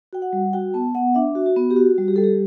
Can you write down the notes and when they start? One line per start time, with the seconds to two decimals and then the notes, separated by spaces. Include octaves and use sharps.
0.13 F#4 G5
0.22 F#5
0.33 G3
0.53 F#4 G5
0.74 B3 A5
0.95 B3 F#5
1.15 D4 E5
1.35 F#4
1.46 F#4
1.56 B3
1.71 G4
1.76 F#4
1.98 G3
2.08 G4
2.16 G3 A4
2.24 G4